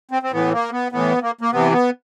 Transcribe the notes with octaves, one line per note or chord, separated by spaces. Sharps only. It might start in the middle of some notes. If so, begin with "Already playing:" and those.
C4
C4
A2 E3 B3
A#3
B3
A2 E3 B3
A#3
A#3
C3 E3 B3
B3